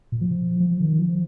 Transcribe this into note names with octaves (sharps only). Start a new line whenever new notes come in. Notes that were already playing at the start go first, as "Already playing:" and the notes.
A#2
F3
F3
D#3
F3